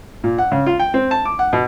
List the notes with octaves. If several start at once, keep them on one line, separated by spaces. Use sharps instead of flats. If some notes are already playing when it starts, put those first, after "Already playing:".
A#2
F#5
C#3
F4
G5
C4
A5
D6
F#5
B2